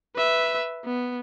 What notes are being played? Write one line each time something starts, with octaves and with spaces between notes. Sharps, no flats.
B4 E5
B3